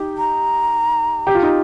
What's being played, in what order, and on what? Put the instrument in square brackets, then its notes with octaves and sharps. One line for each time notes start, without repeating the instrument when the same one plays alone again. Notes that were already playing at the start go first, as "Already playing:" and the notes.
Already playing: [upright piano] D#4 G4
[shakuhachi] A#5
[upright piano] G4
F4
D#4